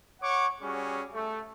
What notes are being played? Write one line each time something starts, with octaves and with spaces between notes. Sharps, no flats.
C#5 F#5 C#6 D6
G3 C#4 F#4 G#4
A3